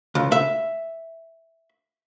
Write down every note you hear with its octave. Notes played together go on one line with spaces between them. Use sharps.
C#2
E5